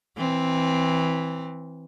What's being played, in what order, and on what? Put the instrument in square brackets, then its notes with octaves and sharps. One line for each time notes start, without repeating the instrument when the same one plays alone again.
[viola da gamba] E3 C4